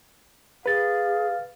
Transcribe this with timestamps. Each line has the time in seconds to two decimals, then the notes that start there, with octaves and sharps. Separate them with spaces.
0.66 G#4 B4 F5 A6